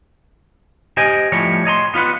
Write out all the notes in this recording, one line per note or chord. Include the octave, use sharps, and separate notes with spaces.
G4 C5 D#5 G5 G#5
A2 F3 G3 C#5
C#5 D#5 A#5 C6
B3 F4 B4 F#5